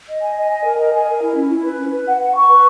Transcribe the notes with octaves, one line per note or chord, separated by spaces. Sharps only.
D#5
G#5
D#5
G#5
A#4
D#5
G#5
A#4
E4
C#4
E4
B4
C#4
B4
F#5
F#5
C#6
B4